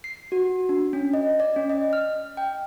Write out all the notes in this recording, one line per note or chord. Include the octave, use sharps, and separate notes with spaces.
C7
F#4
D4
C#4
D#5
D5
C#4
D#5
F6
G5